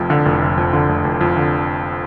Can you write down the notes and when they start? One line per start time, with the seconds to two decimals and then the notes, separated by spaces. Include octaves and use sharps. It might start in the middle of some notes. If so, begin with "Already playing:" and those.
Already playing: F1 F2
0.10 D3
0.25 F1
0.42 F1
0.57 F2
0.73 D3
0.89 F1
1.04 F1
1.21 F2
1.36 D3